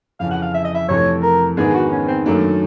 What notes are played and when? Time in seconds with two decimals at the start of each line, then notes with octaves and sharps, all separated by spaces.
0.20 F2 C#3 E3 F5
0.31 F#5
0.42 F5
0.54 E5
0.65 D#5
0.74 E5
0.89 F2 C3 E3 A3 C#5
1.23 A#4
1.57 G#2 D#3 G#3 B3 D4 G#4
1.74 F#4
1.91 C#4
2.08 C4
2.26 F#2 D#3 F#3 A3 A#3 D4